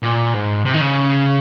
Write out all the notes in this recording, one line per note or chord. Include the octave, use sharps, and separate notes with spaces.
A#2
G#2
C3
D#3
C#3